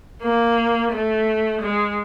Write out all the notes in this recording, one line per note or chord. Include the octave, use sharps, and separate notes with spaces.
A#3
A3
G#3